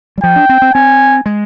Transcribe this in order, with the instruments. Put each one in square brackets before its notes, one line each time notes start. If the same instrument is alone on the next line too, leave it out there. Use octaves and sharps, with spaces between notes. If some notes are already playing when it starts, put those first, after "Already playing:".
[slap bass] G3
[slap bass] F3 [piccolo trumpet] G5
[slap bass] D4
C4
C4
[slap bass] C4 [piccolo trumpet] G#5
[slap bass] G#3